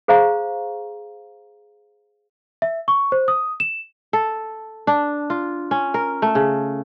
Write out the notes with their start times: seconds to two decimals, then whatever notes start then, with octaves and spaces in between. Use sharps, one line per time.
0.08 G#4 C5 F5 A#5 C#6
2.62 E5
2.88 C#6
3.12 C5
3.28 D#6
3.60 E7
4.13 A4
4.87 D4
5.30 F4
5.71 C#4
5.94 A#4
6.22 A3
6.35 C#3